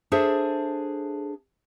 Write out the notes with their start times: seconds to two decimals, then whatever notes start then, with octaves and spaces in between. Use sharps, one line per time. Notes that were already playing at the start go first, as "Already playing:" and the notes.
0.12 D4 G#4 A4 C5 E5